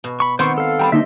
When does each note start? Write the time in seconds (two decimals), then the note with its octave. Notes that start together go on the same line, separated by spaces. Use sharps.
0.04 B2
0.20 B5 C#6
0.39 D#3 B3 C4 C5 C6 C#6
0.58 A4 F5
0.79 G3 C4 G5 A#5 B5
0.92 D3 A#3 D#4 D#5 E5